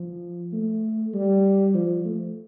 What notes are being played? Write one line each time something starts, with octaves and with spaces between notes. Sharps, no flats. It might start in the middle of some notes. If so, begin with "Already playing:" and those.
Already playing: F3
A3
G3
F3
A3